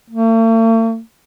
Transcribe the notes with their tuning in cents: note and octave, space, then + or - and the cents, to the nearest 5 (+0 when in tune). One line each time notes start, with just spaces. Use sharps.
A3 +45